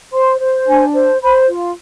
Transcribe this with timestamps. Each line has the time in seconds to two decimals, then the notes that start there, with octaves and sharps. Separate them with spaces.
0.12 C5 C6
0.40 C5
0.66 D4 G#5
0.93 C5
1.21 C5 B5
1.47 F4